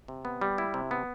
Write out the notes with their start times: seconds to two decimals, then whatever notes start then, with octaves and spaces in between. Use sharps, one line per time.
0.08 C3
0.25 B3
0.41 G3
0.58 E4
0.74 C3
0.91 B3